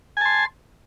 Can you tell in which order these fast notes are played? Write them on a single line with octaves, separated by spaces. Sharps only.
G#5 A5 C6